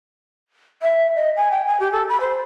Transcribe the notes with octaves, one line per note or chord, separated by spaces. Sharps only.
E5
D#5
G#5
G5
G#5
G4
A4
B5
C5